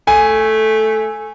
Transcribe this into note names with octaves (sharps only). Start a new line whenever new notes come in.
A3 G#5